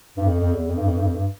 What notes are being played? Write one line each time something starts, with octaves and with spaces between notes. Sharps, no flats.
G2
F2
F2
E2
F2
G2
F2
G2
F2
G2